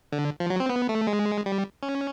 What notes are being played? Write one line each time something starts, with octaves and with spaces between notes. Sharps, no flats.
D3
F3
F#3
C4
B3
A3
G#3
G3
C#4